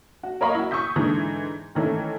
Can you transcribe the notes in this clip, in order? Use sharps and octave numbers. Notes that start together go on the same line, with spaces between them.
F#4
A#4 C#5 D#5 F5 B5 C#6
E4 F#4
C#6 D#6 E6 G6 B6
G#2 D3 E3
D#3 E3 A3 C#4 E4